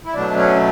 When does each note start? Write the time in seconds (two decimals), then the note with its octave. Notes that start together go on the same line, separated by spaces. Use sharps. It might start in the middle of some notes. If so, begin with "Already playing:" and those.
0.06 E4
0.14 B2 F#3 A3 D4
0.37 C#4